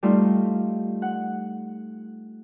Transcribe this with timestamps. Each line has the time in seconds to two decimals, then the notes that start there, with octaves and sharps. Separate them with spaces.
0.03 G3 A3 D#4 F4
1.02 F#5